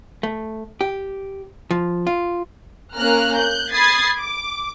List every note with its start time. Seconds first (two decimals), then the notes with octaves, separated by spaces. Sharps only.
0.23 A3
0.81 G4
1.71 F3
2.07 F4
2.95 A#3 C#4 A#5 F6 F#6
3.36 F#6 G6
3.71 B5 D#6 G#6 A6 C7
4.19 D6